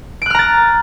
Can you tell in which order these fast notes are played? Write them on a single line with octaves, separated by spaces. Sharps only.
D7 F#6 F6 A#5 A6